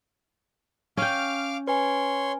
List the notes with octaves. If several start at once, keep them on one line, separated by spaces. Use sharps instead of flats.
C#4 F5 G5 D6 F6
B4 C#5 G#5 C6